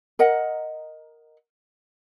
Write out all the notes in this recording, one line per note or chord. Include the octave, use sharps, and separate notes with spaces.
A#4 D#5 F#5